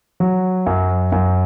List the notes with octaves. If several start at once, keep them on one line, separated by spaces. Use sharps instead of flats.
F#3
F#2
F#2